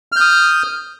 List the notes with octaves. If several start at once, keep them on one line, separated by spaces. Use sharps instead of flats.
D#6 F6 G6